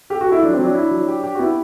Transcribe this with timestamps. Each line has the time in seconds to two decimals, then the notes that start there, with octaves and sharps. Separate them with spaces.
0.10 G4 A4
0.21 F#4
0.26 A4
0.32 E4
0.42 F#3 D4
0.53 C4
0.59 F#3 D4
0.75 E4
0.91 F#3
1.08 G4
1.24 G4
1.35 F#4
1.39 B3 E4